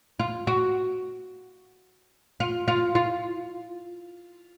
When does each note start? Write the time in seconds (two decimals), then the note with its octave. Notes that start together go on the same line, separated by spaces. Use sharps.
0.20 F4
0.47 F#4
2.40 F4
2.68 F4
2.95 F4